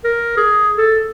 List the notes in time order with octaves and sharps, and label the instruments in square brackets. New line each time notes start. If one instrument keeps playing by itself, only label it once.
[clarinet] A#4
G#4
A4